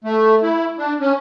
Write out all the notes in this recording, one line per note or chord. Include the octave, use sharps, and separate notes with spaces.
A3
E4
D4
C#4